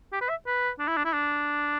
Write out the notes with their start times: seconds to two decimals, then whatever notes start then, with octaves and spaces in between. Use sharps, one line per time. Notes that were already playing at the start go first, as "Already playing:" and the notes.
0.13 G4
0.21 B4
0.29 E5
0.47 B4
0.79 D4
0.88 E4
0.97 D4
1.05 E4
1.13 D4